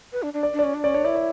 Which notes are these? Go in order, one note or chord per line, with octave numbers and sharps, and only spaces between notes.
B4
D4
D4
D5
D4
C#4 D5
D4
C#4 D5
D4 C#5
E4 D5
D5